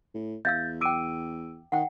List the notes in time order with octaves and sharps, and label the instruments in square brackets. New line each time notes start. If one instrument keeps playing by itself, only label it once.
[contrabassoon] A2
[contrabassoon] E2 [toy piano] E5 F5 E6 [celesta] G6 A6
[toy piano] G5 D6 [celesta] E6 D7 D#7
[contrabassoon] D#3 [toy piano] F#5 G5